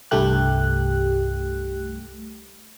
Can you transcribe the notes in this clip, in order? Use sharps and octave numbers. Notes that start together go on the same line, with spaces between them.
C2 G2 A3 G4 F#6